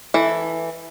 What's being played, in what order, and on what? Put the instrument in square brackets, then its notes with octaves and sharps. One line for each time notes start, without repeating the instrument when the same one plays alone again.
[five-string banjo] E3 A4